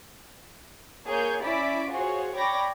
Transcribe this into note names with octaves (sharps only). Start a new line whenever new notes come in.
A#3 G#4 C#5 G6
C#4 E4 D5 B6 D7
F4 F#4 G#4 C5 C#5
C#5 D5 G5 B5 D6 A#6